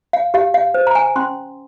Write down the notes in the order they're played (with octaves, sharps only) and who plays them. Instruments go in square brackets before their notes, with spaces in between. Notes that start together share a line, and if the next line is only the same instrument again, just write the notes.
[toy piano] F5
G4 F5
F5
C5
A#5
G#5
C#4 C6